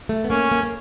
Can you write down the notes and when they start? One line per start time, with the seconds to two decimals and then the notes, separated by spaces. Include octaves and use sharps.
0.09 A3
0.24 B3
0.30 A#3 C#4
0.52 A#3
0.63 A#3